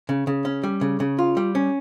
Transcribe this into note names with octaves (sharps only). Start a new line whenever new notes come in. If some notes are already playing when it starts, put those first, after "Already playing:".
C#3
C#3
C#4
G3
C#3
C#3
F4
G3
C#4